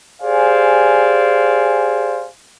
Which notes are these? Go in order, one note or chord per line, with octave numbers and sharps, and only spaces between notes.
G4 G#4 C5 D5 F5 G#5